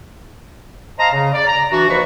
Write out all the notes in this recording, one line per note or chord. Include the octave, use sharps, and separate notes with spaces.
C5 D#5 F5 A5 A#5
C#3
D5
A#5
E3 D4 F#4
D#2 F3 F#4 B4 B5 C#6